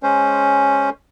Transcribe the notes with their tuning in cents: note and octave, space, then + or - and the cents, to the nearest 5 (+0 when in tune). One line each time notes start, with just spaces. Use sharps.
G#3 +5 C#4 +0 C5 +0